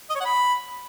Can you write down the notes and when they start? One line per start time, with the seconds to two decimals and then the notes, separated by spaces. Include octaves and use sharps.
0.10 D#5
0.15 C#5
0.20 F#5
0.25 B5